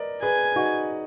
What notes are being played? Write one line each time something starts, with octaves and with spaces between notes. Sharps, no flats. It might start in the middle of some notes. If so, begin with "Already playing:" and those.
Already playing: A#4 B4 D5 D#5
G#4 B4 G#5
D#4 F#4